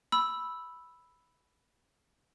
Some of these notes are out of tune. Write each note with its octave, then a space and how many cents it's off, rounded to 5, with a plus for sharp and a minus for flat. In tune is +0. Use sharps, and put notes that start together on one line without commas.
B5 +0 E6 +0